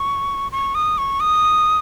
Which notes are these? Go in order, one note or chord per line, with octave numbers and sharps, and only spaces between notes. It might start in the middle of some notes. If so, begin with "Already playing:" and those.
Already playing: C#6
C#6
D#6
C#6
D#6